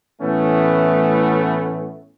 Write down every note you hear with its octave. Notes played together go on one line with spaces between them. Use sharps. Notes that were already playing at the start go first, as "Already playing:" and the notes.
A2 E3 A3 B3 C#4